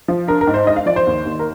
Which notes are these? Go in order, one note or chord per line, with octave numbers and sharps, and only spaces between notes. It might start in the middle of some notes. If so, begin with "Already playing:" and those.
F3
D4 A#4
A#4
G#2
C5
G#3 D#5
F5
F3 D5
C5
D#2
D#2
A#4